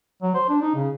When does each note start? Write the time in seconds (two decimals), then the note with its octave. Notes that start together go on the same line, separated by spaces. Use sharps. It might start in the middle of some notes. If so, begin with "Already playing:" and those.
0.22 F#3
0.35 C5
0.49 D4
0.62 D#4
0.76 C#3